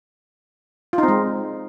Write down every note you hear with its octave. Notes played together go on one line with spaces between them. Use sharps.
F4
D#4
C4
G#3